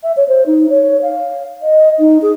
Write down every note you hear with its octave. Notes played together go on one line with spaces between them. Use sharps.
E5
C#5
C5
D#4
C#5
F5
D#5
D#4
G#4